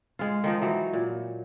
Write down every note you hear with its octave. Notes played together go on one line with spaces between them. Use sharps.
G#3 F4
D#3 F3 D#4
E3 F#3 D#4
A#2